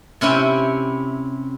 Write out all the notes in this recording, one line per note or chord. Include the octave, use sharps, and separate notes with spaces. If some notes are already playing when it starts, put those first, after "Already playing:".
C3 C#4 E4 G5